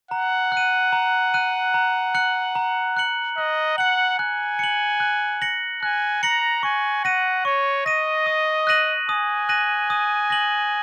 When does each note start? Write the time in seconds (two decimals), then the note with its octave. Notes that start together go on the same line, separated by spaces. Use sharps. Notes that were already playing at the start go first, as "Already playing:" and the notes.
0.11 F#5 A#5
0.52 F#6
0.57 D#7
0.93 A#5
1.34 F#6 D#7
1.74 A#5
2.15 F#6 C#7 F#7
2.55 A#5
2.97 F#6 C#7 F#7
3.37 D#5 F#6
3.78 F#5 C#7 F#7
4.19 G#5 F#6
4.59 C#7 F#7
5.00 F#6
5.42 A#6 C#7 F#7
5.83 G#5 F#6
6.23 A#5 A#6 C#7 F#7
6.63 G#5 C#6
7.04 F#5 A#6 D#7
7.45 C#5 C#6
7.86 D#5 A#6 D#7
8.26 D#6
8.67 F#6 A#6 D#7 F#7
9.08 G#5 D#6
9.49 F#6 A#6 D#7 F#7
9.90 D#6
10.30 A#6 F#7